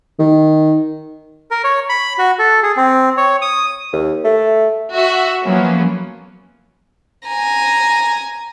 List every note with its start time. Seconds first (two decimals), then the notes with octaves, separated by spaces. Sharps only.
0.19 D#3
1.51 A#4
1.64 C#5
1.89 B5
2.18 F#4
2.39 A4
2.63 G#4
2.77 C4
3.17 C#5
3.42 D#6
3.93 D#2
4.24 A3
4.92 F#4 E5
5.44 F3 F#3 A#3 B3 C#4
7.25 G#5 A#5